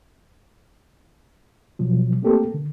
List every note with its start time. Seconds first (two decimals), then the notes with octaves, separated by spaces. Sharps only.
1.79 B2 F3 F#3
2.22 A3 A#3 C4 G4 A4 A#4
2.54 D3